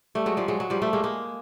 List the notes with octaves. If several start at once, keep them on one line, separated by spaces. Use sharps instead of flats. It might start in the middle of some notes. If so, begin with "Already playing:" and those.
G3 A3
F#3 G#3
F3 G3
F#3 G#3
F#3
F3 G3
G3 A3
G#3 A#3
G#3 A#3